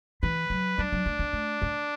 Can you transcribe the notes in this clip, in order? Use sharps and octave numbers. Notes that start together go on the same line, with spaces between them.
E3 B4
F#3
G3 D4
F#3
A3
B3
A3
B3